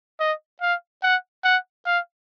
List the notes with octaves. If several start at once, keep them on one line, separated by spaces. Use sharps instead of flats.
D#5
F5
F#5
F#5
F5